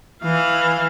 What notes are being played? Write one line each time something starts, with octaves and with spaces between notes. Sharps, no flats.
E3 F5